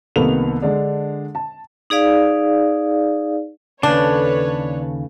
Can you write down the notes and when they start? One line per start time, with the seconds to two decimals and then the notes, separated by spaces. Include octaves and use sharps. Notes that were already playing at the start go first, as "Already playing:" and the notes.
0.16 C2 D#3 A#3 B3 A4 F7
0.62 D3 G#3 D4
1.35 A5
1.90 D#4 G#4 D5 F5
3.83 D#2 C#3 D4 A4 B4 C#5